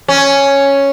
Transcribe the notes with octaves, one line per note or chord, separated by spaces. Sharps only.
C#4